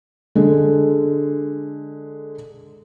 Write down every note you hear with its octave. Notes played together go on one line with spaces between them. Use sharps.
D3 G#3